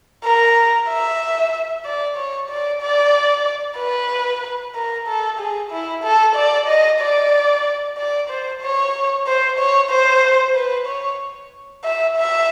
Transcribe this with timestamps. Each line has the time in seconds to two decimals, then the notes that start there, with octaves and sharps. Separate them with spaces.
0.24 A#4
0.89 E5
1.85 D5
2.17 C#5
2.50 D5
2.82 D5
3.79 B4
4.75 A#4
5.08 A4
5.39 G#4
5.71 E4
6.04 A4
6.36 D5
6.68 D#5
7.01 D5
7.98 D5
8.30 C5
8.62 C#5
9.27 C5
9.58 C#5
9.90 C5
10.55 B4
10.87 C#5
11.84 E5
12.16 E5